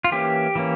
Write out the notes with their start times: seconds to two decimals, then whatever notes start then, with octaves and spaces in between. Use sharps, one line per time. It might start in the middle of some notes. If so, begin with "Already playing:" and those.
0.04 F4
0.12 E3 A#3 C#4 G4
0.55 E3 A#3 C#4